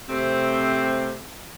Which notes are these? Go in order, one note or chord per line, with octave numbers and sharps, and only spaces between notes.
C3 A3 C4